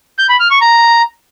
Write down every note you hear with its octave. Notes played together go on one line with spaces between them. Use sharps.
G6
B5
F6
C#6
A#5